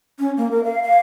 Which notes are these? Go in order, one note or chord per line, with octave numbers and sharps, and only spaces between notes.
C#4
A#3
A#4
F5
F5